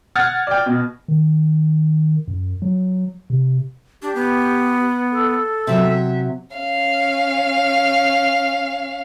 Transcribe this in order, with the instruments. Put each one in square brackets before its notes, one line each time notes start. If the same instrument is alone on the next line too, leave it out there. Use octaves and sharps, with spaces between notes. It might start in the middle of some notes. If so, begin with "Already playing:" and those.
[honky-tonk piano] F#5 F6 G#6 A6
D5 G5
B2
[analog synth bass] D#3
F#2
F#3
C3
[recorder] D4 [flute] G4
[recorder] B3
[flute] A4
[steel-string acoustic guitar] C3 F#3 [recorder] E5
[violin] C#4 F5